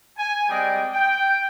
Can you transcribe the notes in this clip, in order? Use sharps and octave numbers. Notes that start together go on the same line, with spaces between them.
G#5
G3 G#3 C4 D5 D#5 G5
G5